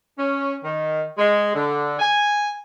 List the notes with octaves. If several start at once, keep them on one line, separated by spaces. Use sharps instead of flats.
C#4
D#3
G#3
D3
G#5